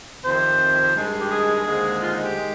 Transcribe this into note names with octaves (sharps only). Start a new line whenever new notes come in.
F2 C3 D#3 C5
G2 D#3 G#3
G4
G#4
D#2 D3 G#3 C4
F4
D#4
G4
D#3 G#3